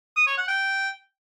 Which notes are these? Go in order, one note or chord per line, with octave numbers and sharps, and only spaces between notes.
D#6
C#5
F#5
G5